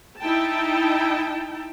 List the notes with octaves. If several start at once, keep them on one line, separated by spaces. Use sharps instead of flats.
D#4 E4 G5 A5